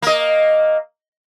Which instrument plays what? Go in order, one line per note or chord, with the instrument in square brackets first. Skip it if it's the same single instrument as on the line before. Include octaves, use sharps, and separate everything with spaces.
[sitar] A#3 D#5